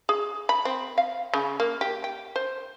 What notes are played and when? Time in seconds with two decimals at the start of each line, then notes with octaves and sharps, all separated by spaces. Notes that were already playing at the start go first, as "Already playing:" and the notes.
0.09 G#4
0.49 B5
0.65 C4
0.98 F5
1.33 C#3
1.60 A#3
1.81 G4
2.04 G5
2.36 C5